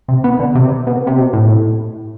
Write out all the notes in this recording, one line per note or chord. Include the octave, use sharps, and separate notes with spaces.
C3
B3
D3
C3
B2
C3
B2
A2